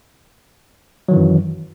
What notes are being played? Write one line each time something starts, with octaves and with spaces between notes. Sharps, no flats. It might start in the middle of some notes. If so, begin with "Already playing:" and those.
F#2 D#3 E3 F#3